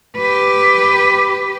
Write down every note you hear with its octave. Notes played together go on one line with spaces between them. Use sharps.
G4 B4